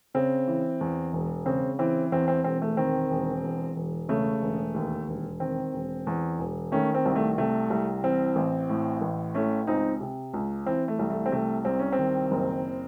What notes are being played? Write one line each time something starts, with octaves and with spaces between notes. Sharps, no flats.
C#3 C4
E3
E2
E1
C#3 C4
E3 C4
E2 C4
C4
E1 C4
A3
D#3 C4
E1
E2
E1
C#3 A3
E1
D#2
E1
D#3 C4
E1
E2
E1
D#3 A3 C#4
C4
C2
A3
C3 A3
C2
E3 C4
A1
A2
A1
E3 A3 C#4
C#2 C4 D#4
C3
C#2
E3 C4
A3
C2
A3
C4
C3 A3
C2 C4
C#4
C4
D#3
F#1